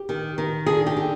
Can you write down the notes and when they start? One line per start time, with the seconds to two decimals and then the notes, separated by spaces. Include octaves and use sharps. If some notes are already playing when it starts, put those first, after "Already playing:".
Already playing: G4
0.09 D#3
0.38 D#3
0.66 D3 G#4
0.86 G4
0.97 D3